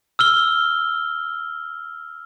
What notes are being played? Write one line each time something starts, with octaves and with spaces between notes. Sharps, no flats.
E6 F6 G7